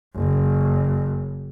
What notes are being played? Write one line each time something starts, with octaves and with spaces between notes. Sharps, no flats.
F#1